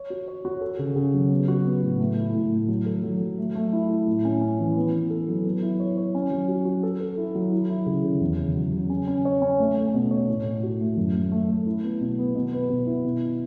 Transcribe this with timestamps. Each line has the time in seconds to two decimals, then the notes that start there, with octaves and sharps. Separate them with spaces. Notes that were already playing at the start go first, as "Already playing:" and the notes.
Already playing: C#5
0.10 F#4
0.28 C#5
0.45 F#4
0.61 A4
0.79 C#3
0.96 C#3
1.14 F#3
1.31 B3
1.48 F#4
1.65 B3
1.82 A2
2.00 A3
2.17 E4
2.34 A2
2.52 A3
2.68 F#3
2.86 A4
3.03 F#3
3.20 F#3
3.38 A3
3.55 A3
3.73 E4
3.89 E4
4.07 A2
4.25 C#4
4.41 C#4
4.59 E3
4.77 B3
4.94 B3
5.10 A4
5.28 F#3
5.45 B3
5.62 E4
5.80 C#5
5.97 C#5
6.15 C#4
6.31 F#3
6.49 F#4
6.65 F#4
6.83 A4
7.00 A4
7.17 E4
7.35 F#3
7.53 E4
7.70 E4
7.86 C#3
8.04 C#3
8.21 E2
8.38 C#3
8.55 F#3
8.73 C#3
8.90 C#4
9.07 C#4
9.25 C#5
9.42 C#4
9.59 A3
9.77 A3
9.94 B2
10.11 C#5
10.28 A2
10.46 A2
10.63 F#4
10.81 A3
10.97 F#2
11.15 A3
11.31 A3
11.50 A3
11.66 E4
11.83 B3
12.01 B2
12.18 B3
12.35 B2
12.53 B4
12.69 B2
12.87 E4
13.05 B2